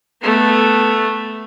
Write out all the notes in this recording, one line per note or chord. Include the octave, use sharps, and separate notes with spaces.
A3 B3